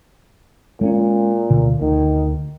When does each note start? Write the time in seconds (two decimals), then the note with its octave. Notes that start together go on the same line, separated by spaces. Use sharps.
0.81 A#2 G#3 B3 C#4
1.50 D2 B2 D3
1.81 D2 D#3